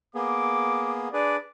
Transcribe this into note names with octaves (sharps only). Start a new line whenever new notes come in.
A#3 B3 G#4 D6
D4 G#4 B4 D5